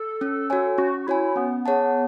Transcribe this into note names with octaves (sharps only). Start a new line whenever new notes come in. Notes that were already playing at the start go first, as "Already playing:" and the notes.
Already playing: A4
C#4
F#4 C#5 G#5
C#4 F#4
E4 F#4 C#5 G#5
B3 C#4
G#4 C#5 F#5 A5